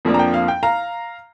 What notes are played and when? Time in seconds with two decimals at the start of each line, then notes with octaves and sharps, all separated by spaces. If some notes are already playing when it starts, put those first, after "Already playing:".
0.05 F2 F3 A#3 D4
0.14 A#5
0.19 G5
0.34 F5
0.48 G5
0.63 F5 A#5